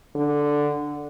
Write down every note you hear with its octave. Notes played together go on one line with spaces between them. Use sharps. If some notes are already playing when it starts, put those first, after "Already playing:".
D3